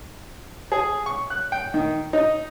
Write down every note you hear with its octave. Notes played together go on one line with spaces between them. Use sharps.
G#4
C#6
F#6
G5
D#3
D#4